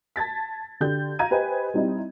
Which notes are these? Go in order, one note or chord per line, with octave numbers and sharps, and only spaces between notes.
A5 G#6 A6 B6
D3 G4 G6
F5 A#5 G#6 D#7
G4 B4 C5 D#5 G#5
G3 C4 D#4 E4